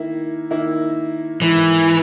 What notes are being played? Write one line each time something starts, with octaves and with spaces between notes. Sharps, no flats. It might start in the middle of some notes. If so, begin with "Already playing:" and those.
Already playing: D#3 A#3 E4
D#3 A#3 E4
G#2 D#3 E3 A#3 E4